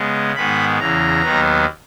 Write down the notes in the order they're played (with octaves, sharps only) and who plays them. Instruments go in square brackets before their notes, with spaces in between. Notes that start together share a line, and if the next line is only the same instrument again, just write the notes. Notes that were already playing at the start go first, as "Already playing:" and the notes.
Already playing: [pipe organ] C#3 G#3 B3
G#2 D#3 G#3 B3 B5
E2 C#3 E3 A#5
D#2 D#3 F#3 B3